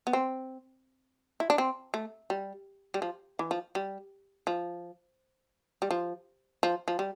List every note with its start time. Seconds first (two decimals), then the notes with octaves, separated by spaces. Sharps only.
0.07 B3
0.13 C4
1.40 E4
1.50 D4
1.58 C4
1.94 A3
2.30 G3
2.94 G3
3.02 F3
3.39 E3
3.51 F3
3.75 G3
4.47 F3
5.82 G3
5.91 F3
6.63 F3
6.88 F3
6.99 G3